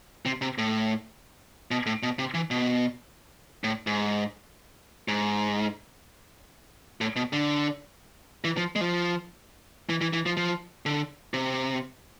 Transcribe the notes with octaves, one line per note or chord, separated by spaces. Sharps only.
C3
C3
A2
B2
A2
B2
C3
E3
B2
A2
G#2
G#2
A2
B2
D3
E3
F3
G#3
F3
E3
E3
E3
F3
F3
D3
C3